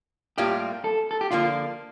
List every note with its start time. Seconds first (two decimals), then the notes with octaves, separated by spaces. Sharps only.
0.38 A2 G3 A#3 F4 G4
0.84 A4
1.11 A4
1.21 G4
1.31 D3 F3 A#3 F4